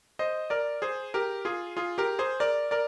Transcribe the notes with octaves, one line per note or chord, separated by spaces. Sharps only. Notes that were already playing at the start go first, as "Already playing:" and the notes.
C5 D#5
A#4 D5
G#4 C5
G4 A#4
F4 G#4
F4 G#4
G4 A#4
G#4 C5
A#4 D5
A#4 D5